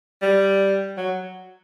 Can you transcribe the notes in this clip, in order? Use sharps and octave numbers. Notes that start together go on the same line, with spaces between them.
G3
F#3